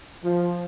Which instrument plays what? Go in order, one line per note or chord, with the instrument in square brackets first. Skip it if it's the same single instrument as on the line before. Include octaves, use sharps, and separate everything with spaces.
[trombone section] F3